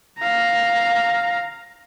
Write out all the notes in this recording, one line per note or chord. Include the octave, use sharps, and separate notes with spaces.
F5 A#5